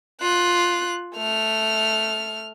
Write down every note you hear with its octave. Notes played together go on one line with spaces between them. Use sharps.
F4 F#6
A3 F6